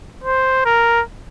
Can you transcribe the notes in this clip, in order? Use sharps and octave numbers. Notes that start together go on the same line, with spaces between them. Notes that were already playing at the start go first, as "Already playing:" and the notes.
C5
A#4